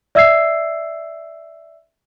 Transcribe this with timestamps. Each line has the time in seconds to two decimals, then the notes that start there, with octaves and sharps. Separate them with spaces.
0.15 D5 E5 E6 G#6 C7